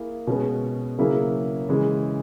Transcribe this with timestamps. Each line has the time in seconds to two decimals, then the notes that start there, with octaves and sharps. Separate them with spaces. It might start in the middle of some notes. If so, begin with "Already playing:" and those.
Already playing: A#3 E4 G#4
0.27 B2 G#3 C#4 G#4 B4
0.98 C#3 F#3 A#3 E4 G#4
1.69 C#3 E3 G#3